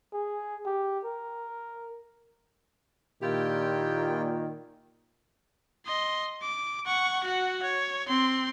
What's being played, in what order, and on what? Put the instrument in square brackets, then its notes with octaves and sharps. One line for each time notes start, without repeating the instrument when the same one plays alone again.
[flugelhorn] G#4
G4
A#4
[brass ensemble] A#2 [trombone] D#3 [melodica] E4 F4 G5 [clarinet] G4
[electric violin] D#5 C6
D6
F#5 C#6
F#4 F#5
C#5
C4 C6